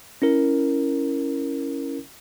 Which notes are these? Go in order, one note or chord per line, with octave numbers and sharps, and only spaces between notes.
C#4 E4 A#4